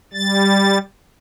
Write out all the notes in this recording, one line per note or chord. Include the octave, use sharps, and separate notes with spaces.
G3 A6